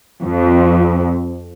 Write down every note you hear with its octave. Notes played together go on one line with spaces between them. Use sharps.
F2